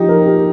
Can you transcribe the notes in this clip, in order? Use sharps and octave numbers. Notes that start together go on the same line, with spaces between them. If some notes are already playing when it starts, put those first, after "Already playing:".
Already playing: F3 D#4 G4
A#4
G4